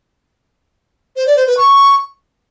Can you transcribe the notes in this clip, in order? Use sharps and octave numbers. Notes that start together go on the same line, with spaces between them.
C5
D5
C5
B4
C#6